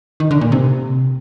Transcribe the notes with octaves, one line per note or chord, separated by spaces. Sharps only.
D#3
D3
A#2
C3